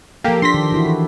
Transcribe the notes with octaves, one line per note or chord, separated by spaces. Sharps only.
F3 A#3 G4 A4
D4 G4 C6 A#6 B6
D#3
E3 E4 F#4
A4